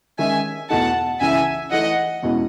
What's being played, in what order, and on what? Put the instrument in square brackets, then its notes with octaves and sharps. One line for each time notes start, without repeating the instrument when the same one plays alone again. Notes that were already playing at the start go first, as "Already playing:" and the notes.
[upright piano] D#3 G#3 C#4 [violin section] E5 G#5
[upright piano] E2 B2 A3 D#4 [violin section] F#5 A5
[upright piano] C#2 C#3 E3 [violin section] E5 G#5
[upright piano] E3 A3 D#4 [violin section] D#5 F#5
[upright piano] E2 B2 G#3 C#4 E4